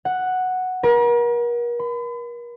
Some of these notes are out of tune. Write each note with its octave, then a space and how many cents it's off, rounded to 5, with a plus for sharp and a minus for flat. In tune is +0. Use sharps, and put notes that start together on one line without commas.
F#5 +0
A#4 +40
B5 +40